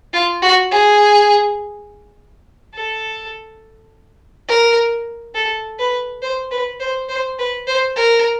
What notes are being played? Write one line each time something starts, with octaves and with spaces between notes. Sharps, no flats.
F4
F#4
G#4
A4
A#4
A4
B4
C5
B4
C5
C5
B4
C5
A#4